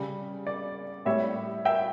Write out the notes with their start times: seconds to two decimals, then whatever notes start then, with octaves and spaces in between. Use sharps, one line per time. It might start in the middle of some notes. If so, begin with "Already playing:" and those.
Already playing: C#3 G3
0.47 D5
1.05 A2 G3 C#5 E5
1.65 E5 G5